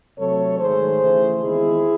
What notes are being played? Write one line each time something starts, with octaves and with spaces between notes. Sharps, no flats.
C3 F#3 A3 C4 A4 C#5
G#2 D#3 A3 G#4 C5
C#3 E3 A3
E2 D#3 G#3 C4 E4 G#4